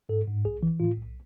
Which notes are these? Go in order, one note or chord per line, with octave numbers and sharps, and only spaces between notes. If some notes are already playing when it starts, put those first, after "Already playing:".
G#2 A4
G#2
B1 G#4
E3
A2 F4
B1